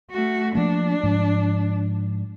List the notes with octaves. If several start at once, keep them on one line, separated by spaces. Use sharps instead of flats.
A3 F#4
F3 A#3 D4
G#2 F3